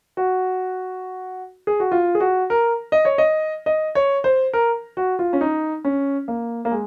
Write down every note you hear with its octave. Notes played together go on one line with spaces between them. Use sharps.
F#4
G#4
F#4
F4
G#4
F#4
A#4
D#5
C#5
D#5
D#5
C#5
C5
A#4
F#4
F4
C#4
D#4
C#4
A#3
A#3
G#3